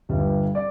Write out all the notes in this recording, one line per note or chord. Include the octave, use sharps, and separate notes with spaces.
G1 G2 G3
D5